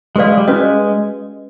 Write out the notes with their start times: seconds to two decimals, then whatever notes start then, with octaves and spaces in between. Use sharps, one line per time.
0.16 G#3 G4 B4 D5 F5
0.27 G#3
0.37 G3
0.47 G#3 C#4 F#4 B4 D#5